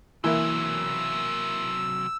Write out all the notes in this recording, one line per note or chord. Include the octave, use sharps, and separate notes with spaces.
C3 E3 F#3 A#3 E4 E6